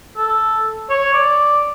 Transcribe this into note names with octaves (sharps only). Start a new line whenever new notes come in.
A4
C#5
D5